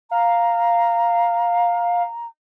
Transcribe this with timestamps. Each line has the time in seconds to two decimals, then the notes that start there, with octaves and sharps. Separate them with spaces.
0.11 F5 A#5